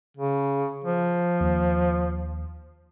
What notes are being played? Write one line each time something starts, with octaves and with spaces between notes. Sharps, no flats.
C#3
F3
D#2